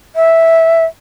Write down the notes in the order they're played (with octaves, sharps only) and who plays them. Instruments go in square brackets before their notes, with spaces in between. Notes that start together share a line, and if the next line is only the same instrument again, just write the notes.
[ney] E5